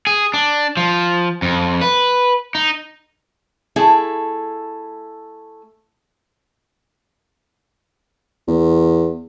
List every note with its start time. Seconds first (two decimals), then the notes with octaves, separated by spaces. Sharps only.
0.07 G#4
0.34 D4
0.77 F3
1.42 F2
1.81 B4
2.55 D#4
3.76 A3 E4 G#4
8.48 E2